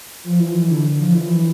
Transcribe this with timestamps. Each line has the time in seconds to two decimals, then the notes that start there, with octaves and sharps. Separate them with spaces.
0.24 F3
0.39 E3
0.54 E3
0.70 D3
0.99 F3
1.14 E3